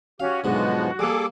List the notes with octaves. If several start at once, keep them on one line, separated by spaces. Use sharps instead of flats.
C#4 F#4 G4 F5
B1 G#2 D3 F3 G#3 B3 F#4
G3 A#3 G#4 A4 D6